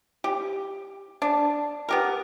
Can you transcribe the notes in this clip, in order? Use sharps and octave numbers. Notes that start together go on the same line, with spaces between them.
G4
D4
B3 G4 A#4